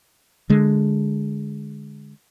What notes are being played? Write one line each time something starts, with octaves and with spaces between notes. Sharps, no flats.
D3 G#3